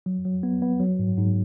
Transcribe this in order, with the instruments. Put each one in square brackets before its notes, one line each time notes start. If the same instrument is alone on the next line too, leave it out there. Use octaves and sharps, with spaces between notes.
[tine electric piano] F#3
F#3
B3
B3
F#3
G#2
G#2